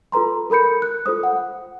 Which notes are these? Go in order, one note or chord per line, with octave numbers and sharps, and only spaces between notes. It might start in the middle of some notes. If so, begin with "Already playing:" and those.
F4 A4 B4 A#5 C6
A4 A#4 B5 G6 C#7
F#6
F4 A4 C5 D#6
F#5